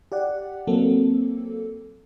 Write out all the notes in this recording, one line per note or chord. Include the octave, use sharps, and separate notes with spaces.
G4 D5 F#5
F#3 A#3 C4 A4